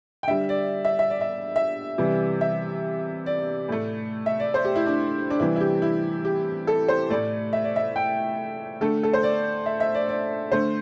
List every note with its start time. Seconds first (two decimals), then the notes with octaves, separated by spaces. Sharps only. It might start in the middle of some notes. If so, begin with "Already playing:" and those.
0.23 G5
0.27 D3 G3 E5
0.49 D5
0.85 E5
0.99 E5
1.10 D5
1.21 E5
1.56 E5
1.98 C3 E3 G3
2.41 E5
3.26 D5
3.69 A2 A3
4.26 E5
4.40 D5
4.54 C5
4.65 G4
4.76 E4
4.86 D4
5.30 D4
5.40 C3 E3 G3 E4
5.56 E4
5.61 G4
5.82 E4
6.25 G4
6.67 A4
6.88 C5
7.10 A2 A3 D5
7.53 E5
7.64 D5
7.76 E5
7.96 G5
8.81 D3 A3 A4
9.03 A4
9.13 C5
9.23 D5
9.66 E5
9.80 E5
9.94 D5
10.09 D5
10.51 D3 A3 C5